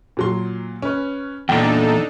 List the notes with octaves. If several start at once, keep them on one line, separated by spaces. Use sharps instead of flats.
A#2 F#3 C6
C#4 B4
E2 A#2 D4 D#4 A4 G5